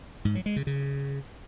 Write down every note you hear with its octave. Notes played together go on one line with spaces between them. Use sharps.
G#2
F#3
G#3
C#3
C#3